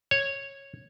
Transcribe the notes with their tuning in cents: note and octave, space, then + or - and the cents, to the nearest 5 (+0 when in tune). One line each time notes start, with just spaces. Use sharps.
C#5 -10